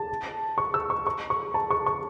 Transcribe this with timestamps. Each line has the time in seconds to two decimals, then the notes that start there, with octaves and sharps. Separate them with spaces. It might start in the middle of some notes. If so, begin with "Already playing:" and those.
Already playing: A5
0.58 C#6
0.74 E6
0.90 C#6
1.07 C#6
1.30 C#6
1.54 A5
1.70 C#6
1.86 C#6